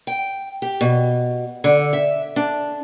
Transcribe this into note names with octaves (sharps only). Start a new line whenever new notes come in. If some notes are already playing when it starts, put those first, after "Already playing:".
G5
G4
B2
D3
E5
D4